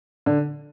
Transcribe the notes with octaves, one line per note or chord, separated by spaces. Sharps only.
D3